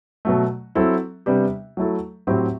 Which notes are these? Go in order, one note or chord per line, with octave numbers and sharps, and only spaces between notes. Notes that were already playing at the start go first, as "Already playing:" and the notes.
B2 F#3 A3
F#3 C4 E4 A4
C3 G3 B3 D4 G4
F#3 A3 E4 A4
A2 F#3 C4 E4 G4